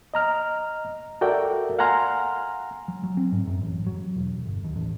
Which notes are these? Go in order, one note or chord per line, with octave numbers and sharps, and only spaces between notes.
D#5 A#5 F6
F#4 A4 A#4 D5 E5 G5
F5 F#5 G#5 A#5 C6 F6
F#3
F#3
C4
G#2
F#2
A1
F#3
E1
G1
D#2
A1